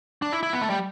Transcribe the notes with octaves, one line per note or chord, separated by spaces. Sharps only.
D4
E4
E4
B3
A3
G3